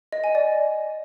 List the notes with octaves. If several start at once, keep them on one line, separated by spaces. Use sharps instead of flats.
D#5
G#5
D5